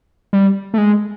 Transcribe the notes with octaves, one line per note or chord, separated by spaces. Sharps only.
G3
A3
G#3